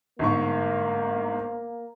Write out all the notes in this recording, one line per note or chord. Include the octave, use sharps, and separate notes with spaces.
G1 G#2 A#3 C#6